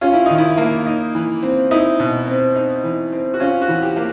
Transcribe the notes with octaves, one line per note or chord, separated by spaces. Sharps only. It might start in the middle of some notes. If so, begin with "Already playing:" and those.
C#4 F4
E4
D#3 D#4
E4
A#3
D#4
E3
C4
D#4 E4
B2
C4
D#4
E3
C4
F#4
C#4 F4
F#4
E3
G4
A#3